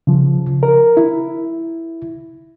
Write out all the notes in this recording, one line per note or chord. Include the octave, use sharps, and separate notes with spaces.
C#3 F3
A#4
E4